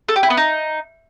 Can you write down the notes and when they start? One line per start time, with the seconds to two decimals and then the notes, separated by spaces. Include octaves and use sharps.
0.09 A4
0.16 G4
0.23 E4
0.30 B3
0.37 D#4